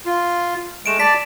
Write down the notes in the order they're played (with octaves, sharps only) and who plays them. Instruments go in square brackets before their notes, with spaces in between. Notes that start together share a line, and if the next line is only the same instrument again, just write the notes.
[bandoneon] F4
[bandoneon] G#3 A3 [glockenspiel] D7 E7
[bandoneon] D5 A5 [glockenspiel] B6